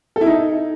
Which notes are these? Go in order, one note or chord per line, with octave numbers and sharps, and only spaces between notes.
A4
E4
D#4